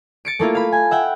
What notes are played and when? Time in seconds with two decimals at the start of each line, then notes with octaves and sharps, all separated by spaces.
0.25 A6 C#7 D7
0.39 A3 A#3 E4 F4
0.55 F5 B5
0.72 G#5
0.91 E5 F#5 G5